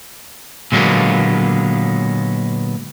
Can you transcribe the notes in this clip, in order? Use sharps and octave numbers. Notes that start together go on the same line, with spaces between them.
A#2 D3 F#3 G#3 A#3 B3